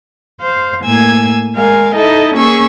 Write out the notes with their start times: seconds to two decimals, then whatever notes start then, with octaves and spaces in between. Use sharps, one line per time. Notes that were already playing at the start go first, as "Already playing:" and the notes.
0.41 C5 F5
0.84 A2 A#3 G#5 E6 G#6
1.54 G#3 A#4 F5 G#5
1.95 D#4 E4 A4 D#5
2.35 A#3 C#4 G#4 C#6 E6